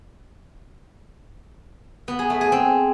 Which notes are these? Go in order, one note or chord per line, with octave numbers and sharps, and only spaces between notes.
B3
G#4
A3
G#4
C4